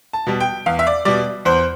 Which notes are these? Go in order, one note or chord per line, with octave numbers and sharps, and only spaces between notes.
A5
B2 G3
G5
E2 F5
E5
D5
B2 G3 D5
E2 C5